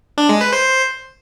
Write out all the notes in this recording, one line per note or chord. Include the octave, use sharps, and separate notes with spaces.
D4
G#3
B4
C5